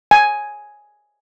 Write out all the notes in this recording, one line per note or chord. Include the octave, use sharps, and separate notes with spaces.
G#5